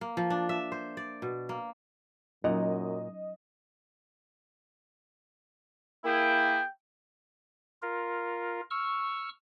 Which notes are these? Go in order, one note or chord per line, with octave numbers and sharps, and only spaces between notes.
A#3
F3
D4
E5
C5
D5
B2
A#3
F#2 A#2 F#3 C#4 D#4 D#5 F#5 A#5
A#3 E4 G#4 G5
F4 A#4
C#6 E6 F6